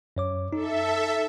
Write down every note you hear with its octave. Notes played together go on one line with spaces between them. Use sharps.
F#2 C#5 D6
D#4 A4 E5